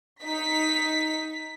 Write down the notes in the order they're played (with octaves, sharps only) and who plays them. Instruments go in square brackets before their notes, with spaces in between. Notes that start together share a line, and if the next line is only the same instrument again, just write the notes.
[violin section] D#4 B6